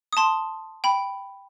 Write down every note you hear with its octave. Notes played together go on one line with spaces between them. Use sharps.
D#6
A5 C6
G5 B5